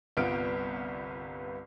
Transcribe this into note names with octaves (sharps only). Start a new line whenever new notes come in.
G1 C2 B3 F4 F6 D7